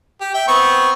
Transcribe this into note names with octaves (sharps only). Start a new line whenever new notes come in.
G4
E5 G5
B3 C4 C#6